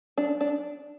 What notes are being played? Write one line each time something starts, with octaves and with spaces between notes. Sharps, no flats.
D4
D4